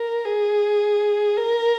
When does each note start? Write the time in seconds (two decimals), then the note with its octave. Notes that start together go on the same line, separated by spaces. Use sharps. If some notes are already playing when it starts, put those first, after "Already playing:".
Already playing: A#4
0.25 G#4
1.37 A#4